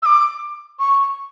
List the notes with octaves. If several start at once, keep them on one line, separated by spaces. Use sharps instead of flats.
E6
D6
C#6